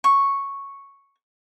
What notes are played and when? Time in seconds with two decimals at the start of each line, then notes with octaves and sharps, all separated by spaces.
0.04 C#6